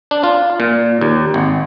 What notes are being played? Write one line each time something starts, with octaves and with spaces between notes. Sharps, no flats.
D4
F4
A#2
D#2
G#1